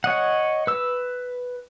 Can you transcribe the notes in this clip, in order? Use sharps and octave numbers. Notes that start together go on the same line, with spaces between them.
C#5 D#5 F#5
B4 E6